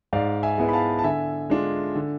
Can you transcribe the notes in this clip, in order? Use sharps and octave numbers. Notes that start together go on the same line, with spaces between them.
G#2 D5 F5
E5 G#5
G#3 B3 E4
B5
F5 A5
A5
D3 E5 G#5
G#3 D4 F4
D3